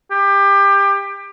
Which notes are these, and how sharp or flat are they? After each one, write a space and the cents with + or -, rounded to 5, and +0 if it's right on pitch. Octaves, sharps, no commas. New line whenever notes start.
G4 +25